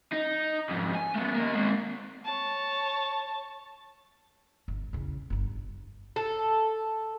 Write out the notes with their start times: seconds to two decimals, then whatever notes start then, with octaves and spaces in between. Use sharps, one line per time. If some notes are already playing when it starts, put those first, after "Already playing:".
0.13 D#4
0.70 F2 G#2
0.95 G#5
1.15 A3 B3
1.35 A#3 D#5
1.54 G#3 C4
2.25 C#5 A5
4.68 G1
4.93 E2 C#3
5.30 G1 D4
6.16 A4